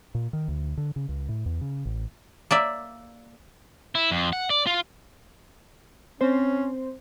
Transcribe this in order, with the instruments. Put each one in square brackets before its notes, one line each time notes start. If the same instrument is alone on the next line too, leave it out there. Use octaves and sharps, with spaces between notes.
[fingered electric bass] A#2
D#3
D2
D3
C#3
C#2
A2
E2
C#3
A1
[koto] A#3 D5 E5
[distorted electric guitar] E4
F2
F#5
D5
F4
[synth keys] C4 C5 [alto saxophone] C#4